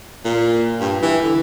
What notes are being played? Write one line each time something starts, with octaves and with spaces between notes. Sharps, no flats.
A#2
G2
E3
D3